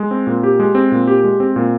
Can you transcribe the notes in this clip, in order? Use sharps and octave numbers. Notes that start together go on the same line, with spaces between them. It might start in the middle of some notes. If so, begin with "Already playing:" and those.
Already playing: G#3
C4
A#2
G4
G#3
C4
A#2
G4
G#3
C4
A#2